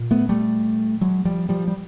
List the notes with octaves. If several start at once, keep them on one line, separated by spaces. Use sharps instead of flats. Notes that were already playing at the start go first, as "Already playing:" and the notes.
Already playing: A#2
A3 B3
G3 A3
F#3 G#3
F3 G3
F3 G3
G3